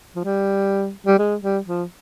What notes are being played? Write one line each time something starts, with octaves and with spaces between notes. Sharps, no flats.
F3
G3
G3
G#3
G3
F3